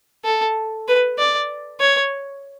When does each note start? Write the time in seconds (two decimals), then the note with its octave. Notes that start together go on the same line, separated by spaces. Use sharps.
0.25 A4
0.88 B4
1.18 D5
1.80 C#5